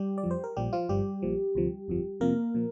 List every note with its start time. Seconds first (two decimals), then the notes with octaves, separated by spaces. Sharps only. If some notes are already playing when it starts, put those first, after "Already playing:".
Already playing: G3 G4
0.18 D5
0.23 F2 F3
0.31 C5
0.44 A#4
0.56 A#1 A#2 F3 G3 G4
0.73 F3 F4
0.89 G1 G2 F3 G3 G4
1.22 A#1 A#2 F3
1.55 D2 C3 F3
1.88 G1 F2 F3
2.20 F2 C3 F3 A#3 A#4
2.55 A#2 F3